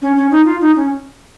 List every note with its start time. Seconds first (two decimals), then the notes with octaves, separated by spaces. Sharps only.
0.02 C#4
0.16 C#4
0.31 D#4
0.45 F4
0.61 D#4
0.76 C#4